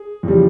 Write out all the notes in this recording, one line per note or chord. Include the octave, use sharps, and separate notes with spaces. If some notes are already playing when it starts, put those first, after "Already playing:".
Already playing: G#4
F2 C#3 E3 G3